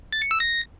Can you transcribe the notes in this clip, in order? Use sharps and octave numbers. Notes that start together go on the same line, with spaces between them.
A6
C#7
E6
A#6